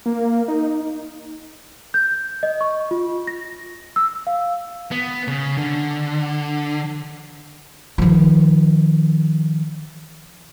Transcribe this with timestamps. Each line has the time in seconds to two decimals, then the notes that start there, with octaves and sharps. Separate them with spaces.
0.06 A#3
0.48 D#4
1.94 G6
2.43 D#5
2.61 C#6
2.91 F4
3.27 A#6
3.96 E6
4.27 F5
4.91 B3
5.28 C#3
5.57 D3
7.98 D#3 F3